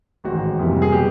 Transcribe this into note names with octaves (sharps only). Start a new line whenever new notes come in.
A1 G#2 D#3 F#4
F2 C3 E3 G3 A#3
G#4
B2 F#3 B3 G4